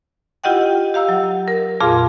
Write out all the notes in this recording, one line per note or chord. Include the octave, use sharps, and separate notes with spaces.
E4 F4 G4 D#5 F#5 G5
G4 F5 A#5 E6
F#3
A#4
F2 A#2 F4 G#4 F5 C6